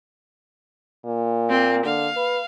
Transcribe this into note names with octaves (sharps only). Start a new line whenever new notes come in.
A#2
A#3 C4
D3 F5
B4